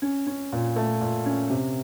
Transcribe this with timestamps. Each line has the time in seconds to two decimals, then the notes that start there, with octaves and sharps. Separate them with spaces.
0.02 C#4
0.27 C#4
0.53 A#2
0.76 A3
1.01 A#2
1.26 C#4
1.50 C3